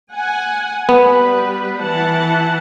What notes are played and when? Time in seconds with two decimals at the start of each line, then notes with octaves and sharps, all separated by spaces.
0.13 F#5 G#5
0.89 G3 B3 B4
1.80 E3 F#5 A5